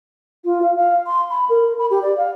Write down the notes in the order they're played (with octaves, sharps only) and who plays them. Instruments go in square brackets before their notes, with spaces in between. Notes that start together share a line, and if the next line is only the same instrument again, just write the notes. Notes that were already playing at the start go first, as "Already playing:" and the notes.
[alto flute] F4
F5
F5
C6
B5
A#4
B5
G4
D5
F5